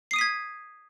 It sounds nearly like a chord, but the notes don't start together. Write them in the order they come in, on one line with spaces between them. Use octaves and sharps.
C7 D#6 D#7 B6 G#6